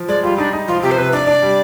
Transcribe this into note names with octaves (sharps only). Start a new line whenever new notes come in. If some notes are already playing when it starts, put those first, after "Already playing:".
Already playing: F3
G#3 D5
G3 F4
D4 D#4
D#4
F3 F4
C3 G4
C5
C3 B4
D4 D5
D4
G3